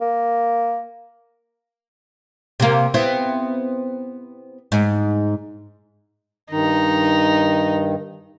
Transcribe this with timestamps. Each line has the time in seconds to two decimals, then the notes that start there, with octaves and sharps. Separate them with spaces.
0.01 A#3
2.60 C3 A#3
2.94 B3 C4 E4
4.72 G#2
6.51 G2 D#3 D#4